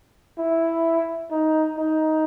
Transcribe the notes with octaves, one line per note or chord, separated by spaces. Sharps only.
E4
D#4
D#4